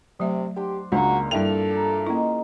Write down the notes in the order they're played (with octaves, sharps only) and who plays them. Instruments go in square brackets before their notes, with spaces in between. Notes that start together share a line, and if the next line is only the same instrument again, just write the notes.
[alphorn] C3 [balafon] F#3 A3 E5
[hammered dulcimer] D4 C5 [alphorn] G4 [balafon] F#5
[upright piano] C#2 [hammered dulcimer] A#2 F3 A#5 [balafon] D4 [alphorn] F#4
[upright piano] G2 E4 F7 [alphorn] A4 [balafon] G5
[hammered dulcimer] G4 A#4
[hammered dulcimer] D#3 G#3 [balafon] A#3 C#4 E4